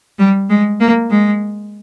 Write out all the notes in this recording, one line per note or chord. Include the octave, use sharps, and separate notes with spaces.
G3
G#3
A#3
G#3